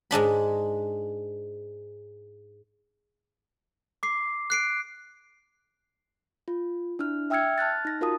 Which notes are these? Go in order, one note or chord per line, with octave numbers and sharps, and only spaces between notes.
G#2 G#3 D4 B5
D6 C7
F#6 C7 D7
F4
D4 E4 F6
E5 G5 E6 F6 G#6 C#7
A5 F6 F#6 A6
D#4 A#6
F4 F#4 A#4 F5 A5 D#6